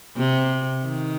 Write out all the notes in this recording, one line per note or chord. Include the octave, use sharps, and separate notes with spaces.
C3
D#3